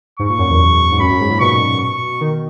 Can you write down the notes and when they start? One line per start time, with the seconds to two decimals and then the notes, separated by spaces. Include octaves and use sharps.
0.19 G#2 C#6
0.30 A#2
0.39 F#2
0.49 E2
0.92 G#2
1.00 F#2 B5
1.10 F#2
1.20 G#2
1.30 A#2
1.39 B2 C#6
1.80 C#6
2.21 D#3